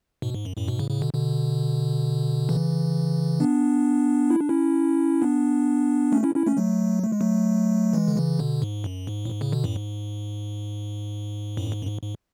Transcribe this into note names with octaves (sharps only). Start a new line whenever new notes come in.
G#2 B2
G#2
F#2
F#2 A2
G#2 B2
A2 C#3
A2 C#3
B2 D3
B2 D3
C#3 E3
B3 D4
E4
D4
C#4 E4
B3 D4
A3 C#4
C#4 E4
C#4 E4
A3 C#4
F#3 A3
A3
G#3
F#3 A3
E3 G#3
D3
C#3 E3
B2 D3
G#2
F#2
G#2
A2
G#2
A2 C#3
B2 D3
F#2 A2
G#2
F#2 A2
G#2
F#2
G#2
G#2